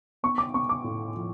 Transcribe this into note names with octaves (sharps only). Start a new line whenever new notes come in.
B3 C#6
D6
B3 C#6
D6
A2
F3